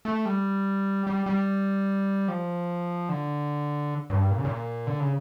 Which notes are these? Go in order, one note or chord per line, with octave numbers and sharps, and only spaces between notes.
A3
G3
G3
G3
F3
D3
G2
A#2
C#3
A#2
D3
C#3